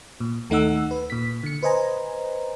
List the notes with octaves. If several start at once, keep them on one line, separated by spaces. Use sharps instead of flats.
A#2
D#2 A3 D#4 F#5 E6
B4
A#2 B6
D3 C#7
B4 C5 D#5 G#5 A#5